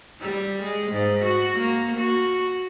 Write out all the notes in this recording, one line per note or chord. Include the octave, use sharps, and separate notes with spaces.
G3
G#3
G#2
F#4
A#3
F#4